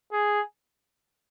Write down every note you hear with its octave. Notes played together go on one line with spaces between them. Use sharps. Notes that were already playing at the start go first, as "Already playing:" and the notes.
G#4